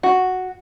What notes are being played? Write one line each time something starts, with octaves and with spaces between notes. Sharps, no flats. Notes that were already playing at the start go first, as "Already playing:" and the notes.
F#4